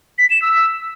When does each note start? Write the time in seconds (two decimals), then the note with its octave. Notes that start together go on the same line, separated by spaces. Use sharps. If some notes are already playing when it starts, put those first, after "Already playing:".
0.18 B6
0.30 E7
0.42 E6